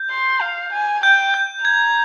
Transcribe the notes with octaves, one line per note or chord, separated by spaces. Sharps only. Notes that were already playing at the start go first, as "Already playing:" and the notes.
Already playing: G6
C6
F5
G#5
G5 G6
G6
A#5 G#6